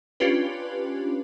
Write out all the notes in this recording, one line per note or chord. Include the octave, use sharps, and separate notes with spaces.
C#4 D4 F4 G4 B4